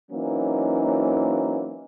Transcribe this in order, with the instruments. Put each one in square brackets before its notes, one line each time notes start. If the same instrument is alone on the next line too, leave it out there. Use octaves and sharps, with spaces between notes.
[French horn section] E3 F#3 A#3 C4 C#4 D#4